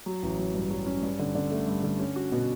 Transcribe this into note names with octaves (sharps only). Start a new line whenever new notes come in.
F#3
A1
F#3
G2
F#3
C#4
G2
D3
D3
A3
G2
D3
C#4
F#4
B2